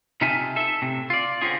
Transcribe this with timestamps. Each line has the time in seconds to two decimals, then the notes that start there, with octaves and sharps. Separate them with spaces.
0.21 C3 D#4 F4 E5 G#5 A5
0.56 A4 E5
0.82 A2 C3
1.10 F4 D5
1.41 D3 C4 C#4 F4 G#4